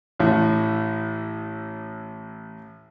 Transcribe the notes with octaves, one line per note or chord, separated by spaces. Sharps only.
A1 A2